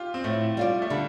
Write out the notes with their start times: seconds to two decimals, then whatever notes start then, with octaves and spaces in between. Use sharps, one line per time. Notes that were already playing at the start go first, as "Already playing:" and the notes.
Already playing: F4 G4
0.14 C4
0.24 A2 A3
0.57 G3 F4 D5
0.82 A3
0.90 D3 G3